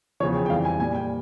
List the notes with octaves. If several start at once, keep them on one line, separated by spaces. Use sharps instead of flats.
E2 C#3 F3 C#5
G5
G5
F2 E3 G3 F5
G#5
A#2 G3 G#5
G5